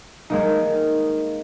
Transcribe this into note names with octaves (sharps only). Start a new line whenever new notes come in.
G#3 A#3 D#4